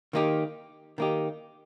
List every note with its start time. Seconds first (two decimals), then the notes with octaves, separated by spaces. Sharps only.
0.13 D#3 A#3 D#4 G4
0.98 D#3 A#3 D#4 G4